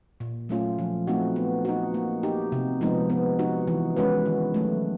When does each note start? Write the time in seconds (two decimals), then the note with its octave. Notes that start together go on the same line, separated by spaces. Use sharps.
0.20 A#2
0.49 F#3 A3 C#4 F4
0.79 F3
1.07 A3 C4 D#4 F#4
1.36 B3
1.65 D#4 F#4
1.94 A#3
2.23 D#4 G4
2.52 C3
2.81 F3 G#3 B3 D#4
3.10 B3
3.39 D#4 F#4
3.67 E3
3.96 G#3 C#4 F#4 B4
4.26 D#3
4.54 F#3 A3